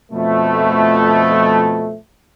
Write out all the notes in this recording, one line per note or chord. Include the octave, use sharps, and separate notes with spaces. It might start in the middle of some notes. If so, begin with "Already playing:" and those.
F2 B2 F3 A3